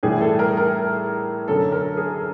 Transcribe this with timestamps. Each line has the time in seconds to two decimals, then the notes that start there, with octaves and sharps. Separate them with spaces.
0.03 A2 E3 G3 G#4
0.21 A4
0.39 A#4
0.57 A#4
1.48 F#2 D3 F#3 A4
1.72 A#4
1.97 G#4